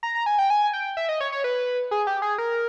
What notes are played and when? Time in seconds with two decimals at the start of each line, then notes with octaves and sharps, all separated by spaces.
0.03 A#5
0.15 A#5
0.26 G#5
0.38 G5
0.50 G#5
0.73 G5
0.97 E5
1.09 D#5
1.21 C#5
1.32 C#5
1.44 B4
1.91 G#4
2.07 G4
2.22 G#4
2.38 A#4